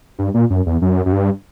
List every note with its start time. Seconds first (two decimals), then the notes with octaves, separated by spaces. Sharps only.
0.19 G2
0.34 A#2
0.50 F#2
0.66 E2
0.82 F#2
1.06 F#2
1.13 G2